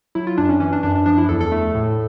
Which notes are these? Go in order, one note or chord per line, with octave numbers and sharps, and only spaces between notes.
F#3 E4
F4
F#2 D4
C#4
E3 C#4
D4
F#2 D4
D4
F3 D4
E4
E2 A4
A4
A3
A2